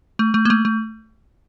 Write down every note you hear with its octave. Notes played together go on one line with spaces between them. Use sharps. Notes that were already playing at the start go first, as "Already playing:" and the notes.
A3
A3
A#3
A3
A3